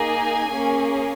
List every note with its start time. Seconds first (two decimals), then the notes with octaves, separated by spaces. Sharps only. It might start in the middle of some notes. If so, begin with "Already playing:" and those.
Already playing: A#3 D#4 G#4
0.13 G#5
0.51 A#3 C#4 G#4